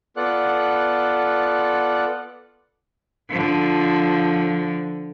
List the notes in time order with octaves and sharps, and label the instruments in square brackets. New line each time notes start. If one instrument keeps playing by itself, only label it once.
[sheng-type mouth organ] B3 F4 A4 D5 F#5 F#6
[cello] D3 F3